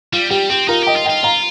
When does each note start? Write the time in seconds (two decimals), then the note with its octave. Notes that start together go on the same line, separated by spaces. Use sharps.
0.13 G3 F4
0.30 G3 G4
0.49 C4 G4
0.68 D#4 F4 A#4
0.83 G4 D#5 G5
0.96 F4
1.05 D#5 G5
1.10 F4
1.23 F5 A#5